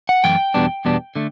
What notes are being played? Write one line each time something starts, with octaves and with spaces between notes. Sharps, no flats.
F#5
F#2 E3 A3 G5
E2 B2 G3 B3 D4
E2 B2 G3 B3 D4
D3 A3